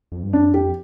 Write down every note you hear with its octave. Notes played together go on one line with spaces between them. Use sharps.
F2
G2
F#2 D4
F2 G4